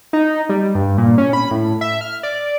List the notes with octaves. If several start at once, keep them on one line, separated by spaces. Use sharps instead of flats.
D#4
G3
G2
A#2
C#4
B5
A2
E5
F6
D5